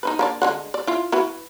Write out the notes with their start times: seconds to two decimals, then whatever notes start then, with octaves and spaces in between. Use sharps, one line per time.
0.03 D#4 E4 B4
0.19 A#3 D4 D5
0.42 D3 G#3 F#5
0.74 D5
0.87 E4 F4
1.12 E4 F#4 B4